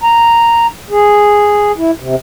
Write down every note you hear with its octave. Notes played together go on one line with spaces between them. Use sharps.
A#5
G#4
E4
C3